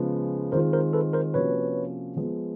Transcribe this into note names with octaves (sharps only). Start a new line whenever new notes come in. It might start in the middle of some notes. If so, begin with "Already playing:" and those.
Already playing: C#3 F3 G#3 B3
D#3 G#3 C4 F4 A#4 C5
A#4 C5
A4 B4
A#4 C5
C3 F3 A#3 C#4 F#4 B4 C#5
F3 G#3 B3